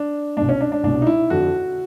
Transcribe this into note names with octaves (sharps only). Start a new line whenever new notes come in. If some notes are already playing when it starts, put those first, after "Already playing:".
Already playing: D4
C2 B2 D4
C#4
D4
D4
C2 B2 D4
D#4
E4
F2 D3 F#4